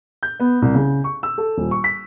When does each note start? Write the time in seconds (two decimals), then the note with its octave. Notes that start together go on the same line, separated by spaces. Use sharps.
0.23 G6
0.40 B3
0.62 C2
0.74 C#3
1.04 C#6
1.23 E6
1.38 A4
1.58 D#1
1.71 C#6
1.84 B6